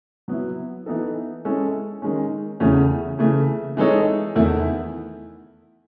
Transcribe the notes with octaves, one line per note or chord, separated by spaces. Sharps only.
F#3 B3 E4
E3 B3 D#4 A4
G#3 C#4 E4 A4
D#3 G#3 C#4
E2 C#3 E3 A3 C#4
C#3 E3 A3
E3 G#3 D#4 A4 C#5
E2 D#3 A3 E4